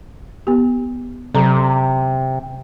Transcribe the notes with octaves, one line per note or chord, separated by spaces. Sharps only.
B3 G4
C3 F#3 A4 A#5